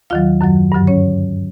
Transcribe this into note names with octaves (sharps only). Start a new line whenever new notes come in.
D#2 D#3 F#3 F4 F5
F#2 D#3 F#3
G2 D3 F#3
C#4 C#5